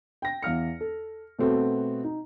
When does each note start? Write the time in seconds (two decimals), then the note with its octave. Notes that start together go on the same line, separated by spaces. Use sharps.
0.22 G5 A#6
0.42 E2 F5 F6 C#7
0.81 A4
1.39 B2 A3 B3 C4 F#4 A4
2.04 D#4